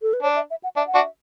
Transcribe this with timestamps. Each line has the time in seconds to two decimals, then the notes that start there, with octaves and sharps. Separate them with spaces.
0.02 A4
0.13 B4
0.23 D4 C#5
0.36 E5
0.50 E5
0.63 F#5
0.76 D4 E5
0.87 F#5
0.94 D4 F#4 E5